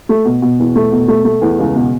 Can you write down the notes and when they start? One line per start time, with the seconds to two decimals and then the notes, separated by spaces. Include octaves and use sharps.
0.09 A3
0.25 B2
0.42 B2
0.59 E2
0.75 A3
0.92 B2
1.08 A3
1.25 A3
1.41 E2
1.59 C#2
1.75 B2